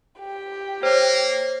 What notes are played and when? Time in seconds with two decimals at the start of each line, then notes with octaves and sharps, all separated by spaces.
0.20 G4
0.83 A#3 C5 C#5